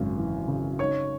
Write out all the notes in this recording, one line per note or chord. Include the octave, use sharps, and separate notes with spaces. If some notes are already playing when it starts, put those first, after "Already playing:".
Already playing: G#1 F#2 C#3
E3
C#3
D#4 C#5 C#6